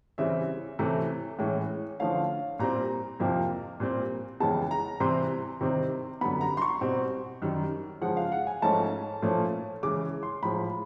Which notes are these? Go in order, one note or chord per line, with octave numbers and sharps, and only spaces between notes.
C#3 E3 G3 C4 E5
C3 E3 A3 C#4
A2 E3 G#3 C#4
D3 F3 A3 C#4 F5
A#2 G3 C4 A#5
F2 C3 F3 A#3
A#2 G3 C4
F2 C#3 E3 G#3 B3 A5
A#5
C3 E3 G3 C4 C6
C3 D#3 G3 C4
F#2 D3 G3 B3 B5
A#5
C6
C#6
B2 G3 C4
F#2 D#3 G3
C#3 F3 G#3 F#5
F5
F#5
G#5
G#2 F3 A3 C#4 A5
A#2 F3 A3 C#4
C#3 E3 G#3 C#4 D6
C6
A2 F3 G#3 B5